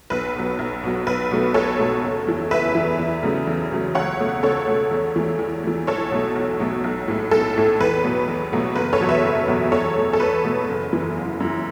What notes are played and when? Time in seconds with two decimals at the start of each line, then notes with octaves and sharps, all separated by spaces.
0.10 B1 B4
0.35 B2 F#3
0.59 B1
0.83 B2 F#3
1.07 B1 B4
1.31 B2 F#3 A3
1.54 B1 A4 C#5
1.79 B2 F#3 A3
2.04 F#1
2.27 E2 E3
2.51 F#1 B4 E5
2.75 E2 E3
2.99 E2
3.23 C#3 F#3 A3
3.47 E2
3.71 C#3 F#3 A3
3.95 C#2 C#5 F#5
4.19 B2 A3
4.43 C#2 A4 C#5
4.67 B2 A3
4.91 E2
5.16 E3 A3
5.39 E2
5.63 E3 A3
5.87 B1 A4 C#5
6.11 B2 F#3 A3
6.35 B1
6.60 B2 F#3 A3
6.84 B1
7.08 A2 A3
7.31 B1 A4
7.56 A2 A3
7.80 E2 B4
8.03 B2 F#3 A3
8.28 E2
8.53 B2 F#3 A3
8.76 F#1 B4
8.93 A4 C#5
9.00 E2 B2 F#3
9.09 B4 E5
9.24 F#1
9.48 E2 B2 F#3
9.72 E2 A4 C#5
9.97 B2 A3
10.13 A4
10.20 E2 B4
10.44 B2 A3
10.69 F#1
10.93 F#2 E3
11.17 F#1
11.40 F#2 E3